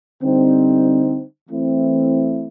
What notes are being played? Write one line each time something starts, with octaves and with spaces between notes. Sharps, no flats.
D3 G3 C4 D#4
E3 A3 C4 E4